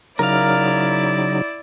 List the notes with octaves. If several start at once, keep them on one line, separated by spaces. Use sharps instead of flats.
C#3 F#3 D#4 E4 A#4 D5 F5